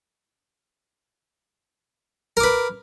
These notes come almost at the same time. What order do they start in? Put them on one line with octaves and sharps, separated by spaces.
A#4 D6 B4